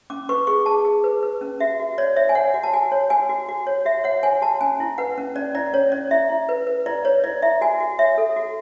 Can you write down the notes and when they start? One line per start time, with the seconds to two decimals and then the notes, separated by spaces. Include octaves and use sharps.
0.10 C#4 D6
0.29 B4 C#6
0.47 G#4 C#6
0.66 G#4 A5
0.85 G#4
1.04 B4
1.23 B4
1.41 C#4
1.60 F#4 E5
1.79 F#4
1.98 C#5 D5
2.16 C#5 E5
2.29 G#5
2.35 C#5 F#5
2.54 F#4
2.63 A5
2.73 F#4 G#5
2.92 C#5
3.10 F#4 G#5
3.29 F#4
3.49 F#4
3.67 C#5
3.85 F#4 E5
4.04 C#5 F#5
4.23 C#5 G#5
4.41 F#4 A5
4.61 C#4 G#5
4.80 E4
4.98 B4 F#5
5.18 C#4
5.36 C#4 D5
5.55 E4 D5
5.73 C#4 C#5
5.92 C#4 D5
6.11 E4 E5
6.29 E4
6.49 B4
6.67 B4
6.86 E4 D5
7.05 B4 C#5
7.24 E4 D5
7.42 E4 E5
7.61 F#4 G#5
7.80 F#4
7.99 C#5 E5
8.18 A4
8.36 F#4